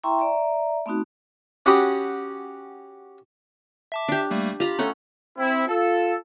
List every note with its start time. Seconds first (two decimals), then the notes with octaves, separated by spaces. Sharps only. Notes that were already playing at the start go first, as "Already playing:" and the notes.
0.04 E4 E5 G5 A#5 C6 C#6
0.19 D5 E5 A#5
0.86 A3 B3 C4 D#4 F#4
1.66 C#4 F#4 G4 F#5 B5 D#6
3.92 E5 A5 D6
4.08 D4 G4
4.31 G3 A3 A#3
4.60 F4 G4 A#5 B5
4.78 A3 C#4 A4 F#5 A#5
5.38 C4 E4
5.68 F4 A4